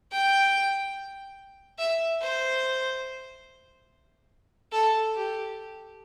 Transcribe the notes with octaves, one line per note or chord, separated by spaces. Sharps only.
G5
E5
C5
A4
G4